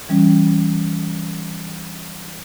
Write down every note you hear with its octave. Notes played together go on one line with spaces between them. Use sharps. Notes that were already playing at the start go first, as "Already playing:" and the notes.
E3 G3 C#4